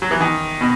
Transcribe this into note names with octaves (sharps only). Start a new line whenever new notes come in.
F#3
E3
D#3
B2